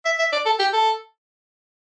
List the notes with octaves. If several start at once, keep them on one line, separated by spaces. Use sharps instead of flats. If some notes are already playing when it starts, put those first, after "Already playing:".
E5
E5
D5
A4
G4
A4